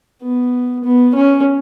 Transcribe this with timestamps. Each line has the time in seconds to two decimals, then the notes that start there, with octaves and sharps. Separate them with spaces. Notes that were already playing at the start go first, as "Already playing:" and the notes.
0.22 B3
0.84 B3
1.15 C#4